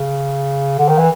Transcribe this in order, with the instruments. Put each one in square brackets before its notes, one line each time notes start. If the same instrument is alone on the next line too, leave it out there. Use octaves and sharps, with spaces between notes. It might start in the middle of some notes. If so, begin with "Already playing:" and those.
Already playing: [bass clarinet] C#3
D3
D#3
E3